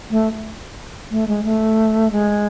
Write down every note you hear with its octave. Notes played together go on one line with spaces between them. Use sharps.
A3
A3
G#3
A3
G#3